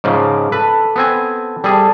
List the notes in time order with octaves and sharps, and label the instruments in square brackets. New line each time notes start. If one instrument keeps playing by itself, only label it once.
[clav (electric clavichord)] G#2 C#3 F3 [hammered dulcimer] D5
[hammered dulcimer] A4 [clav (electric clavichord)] B4
[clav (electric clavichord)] B3 C4 G#5
[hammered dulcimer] C3 A4 [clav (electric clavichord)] G3 G#4